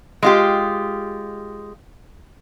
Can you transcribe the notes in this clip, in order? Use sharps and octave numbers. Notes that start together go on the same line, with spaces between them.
G#3 F4 G4